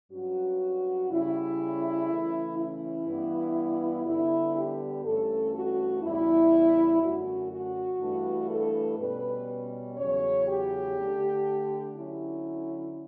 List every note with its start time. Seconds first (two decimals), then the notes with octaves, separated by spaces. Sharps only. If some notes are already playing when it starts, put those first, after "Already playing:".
0.11 G2 F#3 C#4 F#4
1.10 C#3 G3 C#4 E4
2.08 C#3 E3 A3 C#4
2.58 E4
3.08 G2 E3 B3
4.06 D3 G3 B3 E4
4.55 G4
5.04 G2 E3 A3 C#4 A4
5.54 F#4
6.03 E2 C#3 G3 E4
7.02 F#2 D3 A3 C#4 F#4
7.51 F#4
8.00 G2 E3 A3 D4
8.50 A4
8.99 B2 G3 C#4 B4
9.97 E2 C#3 F#3 C#5
10.47 G4
10.96 D3 A3 D4
11.95 D3 F#3 C#4 E4